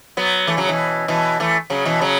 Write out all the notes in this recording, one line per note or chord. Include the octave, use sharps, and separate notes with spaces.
F#3 B3
E3 A3
C#3 F#3
B2 E3
B2 E3
E3 A3
C#3 F#3
B2 E3
C#3 F#3